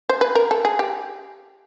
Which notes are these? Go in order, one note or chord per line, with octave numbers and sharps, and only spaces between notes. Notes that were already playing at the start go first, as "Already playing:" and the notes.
C5
B4
A#4
A4
G#4
G4